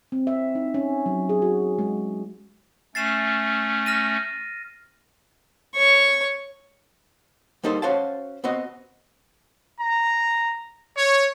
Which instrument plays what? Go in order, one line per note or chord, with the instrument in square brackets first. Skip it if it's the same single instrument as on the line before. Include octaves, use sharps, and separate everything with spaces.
[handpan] C4
E5
D#4
C#4
F#3
G#4
F#4
G#3
[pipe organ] A3 C#4 [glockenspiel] A6 C7 E7
[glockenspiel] F6 A#6 D#7
[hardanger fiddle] C#5 C#6
[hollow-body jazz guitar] G3 A#3 D#4 A4 C5
C#4 F#4 C5 F5 A5
B3 C4 F#4 D#5
[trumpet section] A#5
C#5